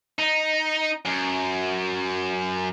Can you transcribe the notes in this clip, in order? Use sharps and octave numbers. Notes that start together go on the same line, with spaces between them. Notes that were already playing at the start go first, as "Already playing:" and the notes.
D#4
F#2